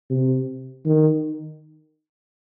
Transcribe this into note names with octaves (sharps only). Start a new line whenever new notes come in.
C3
D#3